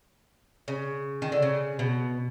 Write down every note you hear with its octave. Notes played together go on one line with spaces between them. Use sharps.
C#3
D#3
D3
C#3
B2